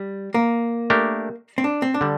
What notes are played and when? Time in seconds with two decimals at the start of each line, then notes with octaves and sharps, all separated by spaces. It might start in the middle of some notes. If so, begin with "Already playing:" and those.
Already playing: G3
0.34 A#3
0.90 A3 D4 G4 A#4
1.58 C4
1.64 D4
1.82 C4
1.94 D4
2.01 D3 G3